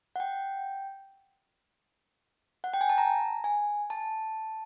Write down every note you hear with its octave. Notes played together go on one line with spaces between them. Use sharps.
F#5
G5
F#5
G5
G#5
A5
A#5
G#5
A5